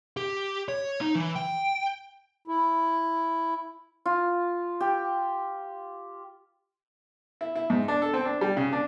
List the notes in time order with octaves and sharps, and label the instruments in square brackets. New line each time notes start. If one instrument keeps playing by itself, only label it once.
[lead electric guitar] G4
C#5
D#4
E3
G5
[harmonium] E4
[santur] F4
G4
[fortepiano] E4
E4
G#2
D4
A4
C4
D4
G3
C#3
D4